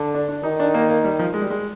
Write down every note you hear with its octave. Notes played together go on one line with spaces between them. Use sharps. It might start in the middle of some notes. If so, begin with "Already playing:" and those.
Already playing: D3
D4
D4
D#3 D#4
D4
A#3
A#3
G3
F3
G#3
G3
G#3